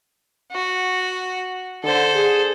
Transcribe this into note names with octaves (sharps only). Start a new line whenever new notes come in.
F#4
D3 A4 C5
G#4